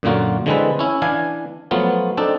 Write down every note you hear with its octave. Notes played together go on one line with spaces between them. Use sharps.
F#2 A#2 D3 A#3 F4 F#4
D3 E3 G#3 C4 A4 B4
C#4 E4
E3 D4 F5 G#5
F3 F#3 A3 B3 F4
C4 D4 D#4 A4